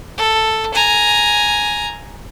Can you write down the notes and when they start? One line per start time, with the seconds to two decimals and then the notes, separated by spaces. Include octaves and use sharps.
0.18 A4
0.74 G#5 A#5